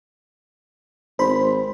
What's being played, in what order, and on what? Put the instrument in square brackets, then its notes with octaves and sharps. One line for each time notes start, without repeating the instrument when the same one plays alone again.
[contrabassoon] G#1 [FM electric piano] C5 B5